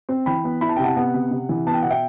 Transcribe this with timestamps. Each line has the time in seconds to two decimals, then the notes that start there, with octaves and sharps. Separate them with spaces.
0.09 C4
0.26 E3 G5 B5
0.44 B3
0.61 E4 B5
0.69 A5
0.76 C3 G5
0.84 F#5 A5
0.96 B3 F#5
1.14 C3
1.31 C3
1.49 E3
1.67 B3 A5
1.74 G5
1.82 B2 F#5
1.90 E5 G5